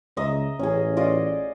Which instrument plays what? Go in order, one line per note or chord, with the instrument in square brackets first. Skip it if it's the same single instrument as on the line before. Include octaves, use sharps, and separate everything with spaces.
[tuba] C#2 [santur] D#5 E5 A#5
[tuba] A1 [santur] C#4 G#4
[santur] F4 D5 D#5